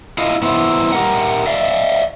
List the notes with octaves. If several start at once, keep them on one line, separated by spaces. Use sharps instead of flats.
E4 F4 D#5 F5
B3 E4 C5
G4 A#4 F#5
D5 E5 F5